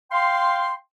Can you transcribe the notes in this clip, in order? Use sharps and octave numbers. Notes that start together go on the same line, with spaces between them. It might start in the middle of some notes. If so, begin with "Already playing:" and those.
F5 G5 C6